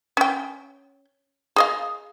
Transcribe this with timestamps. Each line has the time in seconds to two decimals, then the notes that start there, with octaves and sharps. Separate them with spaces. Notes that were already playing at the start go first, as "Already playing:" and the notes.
0.17 C#4 G5
1.56 G#4 D#5 F5